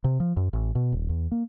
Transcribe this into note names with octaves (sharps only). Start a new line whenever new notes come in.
C3
F3
F#2
A1
B2
D#1
E2
A#3